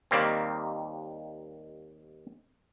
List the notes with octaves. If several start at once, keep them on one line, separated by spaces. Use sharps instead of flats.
D#2 D#3 G3 A#3 C4